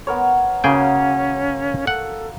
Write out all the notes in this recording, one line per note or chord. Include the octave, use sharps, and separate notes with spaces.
B3 A#4 C#5
C#3 A#3 C#4 F#4 G#4 G5
A4 F#5